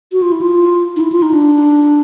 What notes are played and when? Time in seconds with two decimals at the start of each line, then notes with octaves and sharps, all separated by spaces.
0.12 F#4
0.22 F4
0.32 E4
0.41 F4
0.96 D#4
1.00 E4
1.12 F4
1.22 D#4
1.33 D4